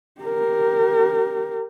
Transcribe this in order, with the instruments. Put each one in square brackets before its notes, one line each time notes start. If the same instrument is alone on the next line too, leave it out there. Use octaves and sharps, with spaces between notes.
[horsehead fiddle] G4 A#4